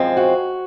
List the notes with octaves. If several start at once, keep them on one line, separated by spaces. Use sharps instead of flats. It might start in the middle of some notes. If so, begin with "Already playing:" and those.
Already playing: F#2 F3 G#3 C4
F#4